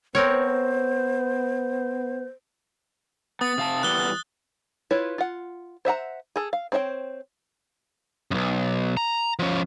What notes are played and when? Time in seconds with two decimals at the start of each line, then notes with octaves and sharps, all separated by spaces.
0.15 B3 C4 A#4 C5 C#5
3.41 B3 D#6 A6
3.58 C3 F5 A5
3.83 E3 G3 B3 F#6 G7
4.91 E4 F4 B4 C#5
5.18 F4 F#5
5.85 C5 E5 F#5 A#5
6.36 G#4 A4
6.53 F5
6.72 C4 C5 C#5 E5 G5
8.31 B1 F#2
8.97 A#5
9.39 F3 C#4